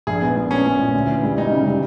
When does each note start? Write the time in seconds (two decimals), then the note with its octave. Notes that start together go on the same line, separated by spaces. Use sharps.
0.07 A#1 G#4
0.22 B3
0.35 A#2
0.51 B3 C#4
0.65 A#2
0.79 A#2
0.94 D2
1.09 E3
1.23 G3
1.37 G3 D#4
1.51 C#3
1.67 G3